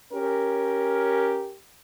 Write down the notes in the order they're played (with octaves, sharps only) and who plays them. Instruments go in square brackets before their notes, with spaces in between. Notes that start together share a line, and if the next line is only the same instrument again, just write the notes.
[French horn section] C#4 G4 A#4